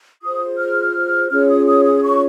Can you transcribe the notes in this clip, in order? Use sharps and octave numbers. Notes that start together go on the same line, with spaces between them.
F4 G#4 C5 D#6
F6
C#4 F4 G#4 C#5 F6
D#6
D#6
D#6
C#6